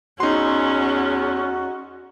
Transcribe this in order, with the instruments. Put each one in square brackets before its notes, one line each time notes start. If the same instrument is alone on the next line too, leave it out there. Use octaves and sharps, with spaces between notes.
[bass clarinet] E2 [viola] C#4 [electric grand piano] D#4 C6 [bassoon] F#4